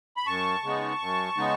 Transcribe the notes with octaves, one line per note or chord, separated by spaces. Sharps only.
B5
F#2 A5 C#6
C#3 G#3 B3 D#4
F#2
C#3 G#3 B3 D#4